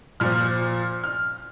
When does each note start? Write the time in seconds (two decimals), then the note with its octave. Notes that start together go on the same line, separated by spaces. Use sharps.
0.20 A#2 F3 F6
1.04 F6